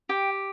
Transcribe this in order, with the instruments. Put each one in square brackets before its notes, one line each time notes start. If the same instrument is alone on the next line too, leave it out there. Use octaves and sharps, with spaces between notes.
[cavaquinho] G4 G5